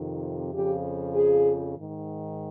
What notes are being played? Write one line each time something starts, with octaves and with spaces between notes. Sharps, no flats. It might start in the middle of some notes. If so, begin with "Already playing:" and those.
Already playing: F2 C3 D#3
F2 C#3 F3 G4
G#4
G#2 D#3